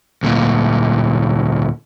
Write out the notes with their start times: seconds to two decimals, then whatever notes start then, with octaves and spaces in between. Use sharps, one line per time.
0.23 D2 A#2